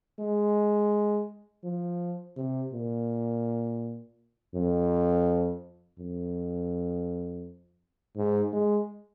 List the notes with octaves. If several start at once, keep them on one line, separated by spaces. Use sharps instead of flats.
G#3
F3
C3
A#2
F2
F2
G#2
G#3